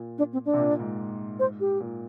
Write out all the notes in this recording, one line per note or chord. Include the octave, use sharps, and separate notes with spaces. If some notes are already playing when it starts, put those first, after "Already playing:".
Already playing: A#2
D4
C4
D4
C3
A#2
G#2
C5
G4
A#2